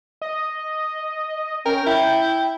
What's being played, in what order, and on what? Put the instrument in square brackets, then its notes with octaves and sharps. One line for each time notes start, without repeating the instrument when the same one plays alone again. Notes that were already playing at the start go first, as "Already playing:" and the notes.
[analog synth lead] D#5
[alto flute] C#4 [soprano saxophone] A#4 [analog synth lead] G5
[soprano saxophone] E4 [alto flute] G5 [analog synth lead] G6